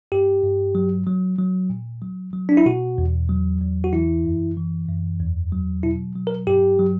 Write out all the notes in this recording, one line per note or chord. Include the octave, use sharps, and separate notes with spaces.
G2 G4
G2
F#3
F#3
F#3
A#2
F#3
F#3
D4
E4
B2 F#4
E2
F#3
E2
F#4
E3 E4
F#2
E3
F#2
E2
F#3
B2 E4
F#3
A#4
G2 G4
F#3